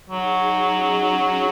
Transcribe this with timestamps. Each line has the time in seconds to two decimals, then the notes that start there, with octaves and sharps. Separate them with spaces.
0.09 F#3 D#4 G#4
0.39 D#4 G#4
0.71 C#4 F#4